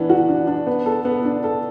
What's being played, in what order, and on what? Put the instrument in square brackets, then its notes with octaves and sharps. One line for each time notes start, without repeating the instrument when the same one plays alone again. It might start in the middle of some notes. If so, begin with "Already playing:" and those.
Already playing: [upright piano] E3 B3 D4
F#4
D4
D4
B3
A4
B3
D4
A4